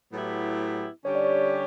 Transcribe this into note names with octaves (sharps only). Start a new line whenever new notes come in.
A2 F#3 B3 E4 G4
D3 G3 C#4 G4 C#5
D5
C#5